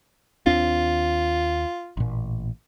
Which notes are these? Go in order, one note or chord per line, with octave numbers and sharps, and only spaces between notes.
D#2 C4 D4 F4
A1 A#2